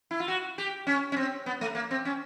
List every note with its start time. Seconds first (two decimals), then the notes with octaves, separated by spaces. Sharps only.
0.11 E4
0.20 F4
0.28 F#4
0.58 G4
0.87 C#4
1.12 C#4
1.17 C4
1.46 B3
1.61 A3
1.75 A#3
1.91 C4
2.05 C#4